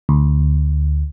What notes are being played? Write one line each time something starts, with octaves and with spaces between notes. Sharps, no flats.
D2